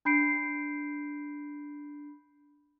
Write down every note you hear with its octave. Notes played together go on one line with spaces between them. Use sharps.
D4 B5 G6 C7 D7